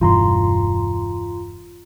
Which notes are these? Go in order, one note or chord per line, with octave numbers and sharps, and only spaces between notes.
E1 G2 E3 F4 A#5 C6